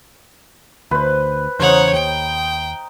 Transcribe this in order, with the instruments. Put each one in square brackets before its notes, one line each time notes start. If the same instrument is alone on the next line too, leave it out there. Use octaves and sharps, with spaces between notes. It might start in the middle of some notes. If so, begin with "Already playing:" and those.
[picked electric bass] D2 [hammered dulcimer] B4 C5
[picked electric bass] E2 C#3 [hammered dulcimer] D#4 C5 [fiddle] C#5 F#5
[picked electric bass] D#2 [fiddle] G5